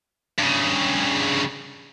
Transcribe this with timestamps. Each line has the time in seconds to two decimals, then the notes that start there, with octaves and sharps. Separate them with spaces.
0.38 G2 C#3